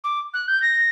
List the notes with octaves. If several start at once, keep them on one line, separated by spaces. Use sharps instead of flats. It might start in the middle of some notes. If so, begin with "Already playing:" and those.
D6
F#6
G6
A#6